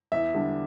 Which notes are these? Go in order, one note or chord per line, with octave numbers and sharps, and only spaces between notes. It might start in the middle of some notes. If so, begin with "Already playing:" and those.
E2 E5
D3 G3 D4